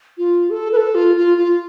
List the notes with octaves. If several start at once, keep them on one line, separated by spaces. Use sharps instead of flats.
F4
A4
B4
A4
F4
F4
F4